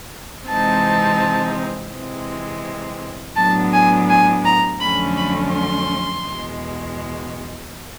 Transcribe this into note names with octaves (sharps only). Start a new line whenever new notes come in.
C3 E3 G#3 C4 D#4 A5
C3 E3 G#3 C4
A2 F#3 B3 D4 A5
G#5
G#5
A#5
F2 D3 F#3 A3 C#4 B5
B5
C6
E2 B2 G#3